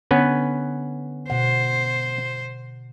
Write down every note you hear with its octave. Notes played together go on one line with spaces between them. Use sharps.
D3 B3 C#4 B4
B2 C5 F#5